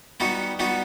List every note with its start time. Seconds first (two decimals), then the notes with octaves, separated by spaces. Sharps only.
0.20 G3 B3 D#4 F#4
0.59 G3 B3 D#4 F#4